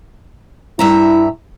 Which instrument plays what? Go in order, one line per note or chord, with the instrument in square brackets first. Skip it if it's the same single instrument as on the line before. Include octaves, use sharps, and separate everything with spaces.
[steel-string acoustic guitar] G2 E5 A#5 [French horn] E4